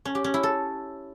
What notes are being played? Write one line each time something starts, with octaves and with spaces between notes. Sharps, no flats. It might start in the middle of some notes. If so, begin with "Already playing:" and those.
C#4
G4
C#4
E4
A4